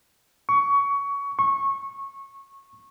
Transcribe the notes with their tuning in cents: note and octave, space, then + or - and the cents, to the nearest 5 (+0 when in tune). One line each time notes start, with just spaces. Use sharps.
C#6 +20
C#6 -20